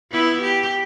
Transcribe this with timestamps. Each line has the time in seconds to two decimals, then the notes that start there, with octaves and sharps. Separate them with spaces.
0.12 B3 E4
0.42 G4